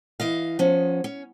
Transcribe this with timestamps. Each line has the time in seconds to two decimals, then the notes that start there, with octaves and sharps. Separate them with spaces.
0.20 E3 D#5 F5
0.59 F3 B3 C#4
1.04 C#4